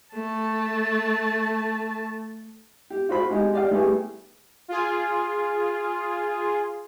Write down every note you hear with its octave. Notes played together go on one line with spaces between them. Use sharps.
A3 A5
G4
F4 F#4 C5 B5
G#3 D#4 G4
G4 D5 D#5 F5 G5
G3 A3 B3 E4 G4 G#4
F4 G#4